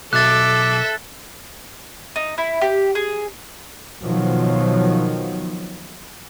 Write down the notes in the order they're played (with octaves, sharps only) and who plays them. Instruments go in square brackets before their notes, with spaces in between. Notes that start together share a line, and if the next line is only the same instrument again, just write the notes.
[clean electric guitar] B1 [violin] A4 E5 [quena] D6 [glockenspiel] F#6 A6
[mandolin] D#4
E4
G4
G#4
[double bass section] B2 D#3 F3 F#3